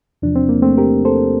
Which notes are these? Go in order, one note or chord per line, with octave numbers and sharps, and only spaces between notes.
E2 C3 F3 D4
C4
A#3
A3 C4
G4 A#4
A4 C5